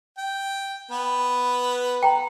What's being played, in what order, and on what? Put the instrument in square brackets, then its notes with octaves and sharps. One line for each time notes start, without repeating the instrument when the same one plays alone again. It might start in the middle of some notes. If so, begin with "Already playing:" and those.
[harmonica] G5
B3 B4
[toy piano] G5 A#5